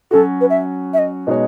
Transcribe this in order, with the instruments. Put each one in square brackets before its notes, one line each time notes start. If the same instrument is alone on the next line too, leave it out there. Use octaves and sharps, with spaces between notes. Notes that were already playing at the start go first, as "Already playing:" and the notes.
[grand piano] F#3 C#4 F#4 [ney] A4
[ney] B4
E5
E5
D#5
[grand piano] B2 G#3 D#4 F#4 C#5